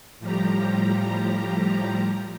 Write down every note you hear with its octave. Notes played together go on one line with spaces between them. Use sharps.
A2 F3 G3 G4 A#5